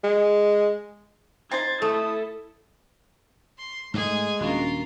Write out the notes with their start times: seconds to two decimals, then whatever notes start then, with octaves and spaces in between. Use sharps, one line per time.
0.04 G#3
1.51 C4 D#4 C5 G#6 A6
1.82 A3 E4 A4 D#6
3.58 C6
3.94 G#2 G#3 A3 G#4 G#5
4.41 D#1 C#4 D4 F4 F#4 A#4